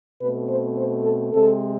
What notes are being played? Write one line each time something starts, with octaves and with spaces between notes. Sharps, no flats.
B2 A3 C4 B4
C5
C5
A4
C3 G#3 C4 A4